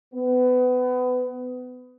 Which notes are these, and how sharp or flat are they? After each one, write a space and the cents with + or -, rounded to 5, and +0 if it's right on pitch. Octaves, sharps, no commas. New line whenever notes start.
B3 +25